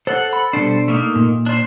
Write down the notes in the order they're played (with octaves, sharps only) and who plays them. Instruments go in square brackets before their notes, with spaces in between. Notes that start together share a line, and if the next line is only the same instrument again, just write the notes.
[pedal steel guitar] A4 F#5 [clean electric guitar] C5
[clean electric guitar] B5
[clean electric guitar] B2 D4 [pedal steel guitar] G3 A4 C5
[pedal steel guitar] A3 A#3 D#4
[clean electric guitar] A#2
[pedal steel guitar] D4 C5